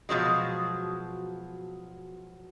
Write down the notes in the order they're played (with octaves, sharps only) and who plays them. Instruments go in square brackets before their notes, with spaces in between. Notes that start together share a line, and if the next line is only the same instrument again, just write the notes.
[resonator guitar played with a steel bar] B2 F3 F#3 G#3